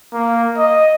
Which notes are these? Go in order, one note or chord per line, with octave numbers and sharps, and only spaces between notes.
A#3
D#5